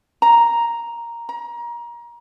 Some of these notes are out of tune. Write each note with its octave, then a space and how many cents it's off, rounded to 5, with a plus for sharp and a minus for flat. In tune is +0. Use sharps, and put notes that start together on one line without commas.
A#5 +0
A#5 +25